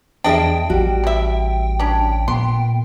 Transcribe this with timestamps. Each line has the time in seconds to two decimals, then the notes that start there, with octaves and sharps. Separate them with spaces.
0.24 E2 D4 G#4 D#5 E5 G5
0.70 A1 G3 F#4
1.04 B2 E5
1.80 C#4 D4
2.28 A#2 B3 C6